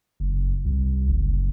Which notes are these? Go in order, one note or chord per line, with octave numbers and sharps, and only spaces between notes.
F#1
C2
F#1